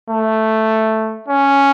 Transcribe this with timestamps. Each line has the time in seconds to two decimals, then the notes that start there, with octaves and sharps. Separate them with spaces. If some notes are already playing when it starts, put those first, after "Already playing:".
0.10 A3
1.28 C#4